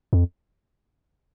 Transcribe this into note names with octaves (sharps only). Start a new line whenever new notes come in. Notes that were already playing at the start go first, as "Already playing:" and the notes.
F2